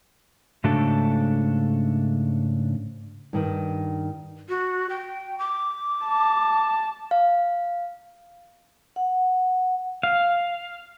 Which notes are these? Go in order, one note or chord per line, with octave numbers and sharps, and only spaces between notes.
G#2 C#3 A3 D4 F#4 A4
G2 D#3
F#4
G5
D6
A5
F5
F#5
F5